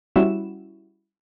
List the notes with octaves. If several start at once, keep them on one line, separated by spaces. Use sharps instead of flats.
G3 C#4 E4 F#4 E7